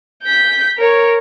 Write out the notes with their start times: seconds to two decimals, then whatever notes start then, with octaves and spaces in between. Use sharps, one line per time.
0.23 G6 B6
0.77 A#4 C#5